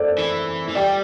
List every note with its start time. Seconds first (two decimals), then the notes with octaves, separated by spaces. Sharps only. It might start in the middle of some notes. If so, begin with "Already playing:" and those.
Already playing: A4 C5 D5
0.18 E3
0.69 E3
0.75 G3 D5 G5